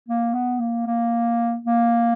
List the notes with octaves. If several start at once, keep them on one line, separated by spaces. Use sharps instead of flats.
A#3
B3
A#3
A#3
A#3